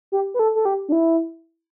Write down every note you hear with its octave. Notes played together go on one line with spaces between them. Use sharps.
G4
B4
A4
A4
G4
D4
E4